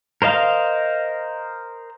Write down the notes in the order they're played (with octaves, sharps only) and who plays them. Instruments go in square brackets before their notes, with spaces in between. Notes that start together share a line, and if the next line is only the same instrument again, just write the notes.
[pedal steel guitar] A#4 C5 D#5 F5